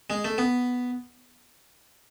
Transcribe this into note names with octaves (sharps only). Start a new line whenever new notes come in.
G#3
A3
B3